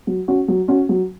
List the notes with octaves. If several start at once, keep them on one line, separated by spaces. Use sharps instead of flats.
F#3
C#4 F#4
F#3
C#4 F#4
F#3